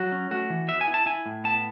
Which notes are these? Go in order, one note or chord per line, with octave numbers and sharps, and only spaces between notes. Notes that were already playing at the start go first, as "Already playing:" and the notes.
Already playing: F#3 F#4
C#4
A3 F#4
E3
B3 E5
G#5
E4
A5
E4 G#5
A2
B3 A5